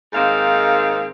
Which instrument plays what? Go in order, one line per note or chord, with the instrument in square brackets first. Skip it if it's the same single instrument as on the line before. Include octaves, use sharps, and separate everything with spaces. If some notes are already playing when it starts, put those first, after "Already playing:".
[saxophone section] G#2 D#3 A#3 C4 F5